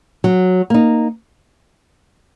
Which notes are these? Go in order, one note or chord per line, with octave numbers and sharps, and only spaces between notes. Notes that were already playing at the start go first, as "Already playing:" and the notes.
F#3
A#3 D#4